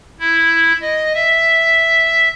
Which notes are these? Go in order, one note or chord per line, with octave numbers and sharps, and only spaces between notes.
E4
D#5
E5